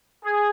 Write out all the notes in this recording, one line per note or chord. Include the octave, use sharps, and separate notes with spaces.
G#4